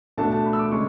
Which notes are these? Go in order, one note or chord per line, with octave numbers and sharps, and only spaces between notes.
B2 A3 D4 A5
A5
B5
E6
D6
C#3 G#3 C#6